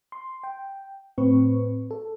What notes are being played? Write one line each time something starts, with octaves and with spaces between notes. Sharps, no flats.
C6
G5
A2 C4 B4 C#6
A4